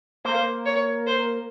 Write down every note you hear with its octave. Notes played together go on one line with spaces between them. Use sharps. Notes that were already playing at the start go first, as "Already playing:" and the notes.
A#3 C5
C#5
C5